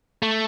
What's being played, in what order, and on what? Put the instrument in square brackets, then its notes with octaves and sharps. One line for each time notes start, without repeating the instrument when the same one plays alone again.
[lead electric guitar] A3